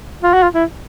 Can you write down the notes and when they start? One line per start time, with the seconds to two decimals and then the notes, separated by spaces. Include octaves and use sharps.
0.23 F4
0.34 F#4
0.43 F4
0.55 E4